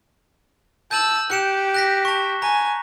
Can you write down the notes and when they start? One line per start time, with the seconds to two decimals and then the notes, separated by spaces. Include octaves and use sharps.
0.91 A5 E6 G6 D#7 F#7
1.30 G4 F#6 C#7 E7
1.74 F#6 A#6 B6
2.05 A5 C#6
2.42 G#5 A#5